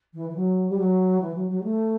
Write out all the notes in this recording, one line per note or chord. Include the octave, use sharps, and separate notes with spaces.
E3
E3
F#3
G3
F#3
E3
F#3
F#3
G3
A3